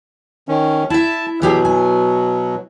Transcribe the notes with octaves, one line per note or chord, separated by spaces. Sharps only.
D#3 C#4
E4 E5 A5
B2 E3 F#3 G4 G#4
G#5